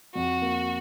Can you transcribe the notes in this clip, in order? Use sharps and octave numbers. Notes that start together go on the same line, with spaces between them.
F2 F#4
A#3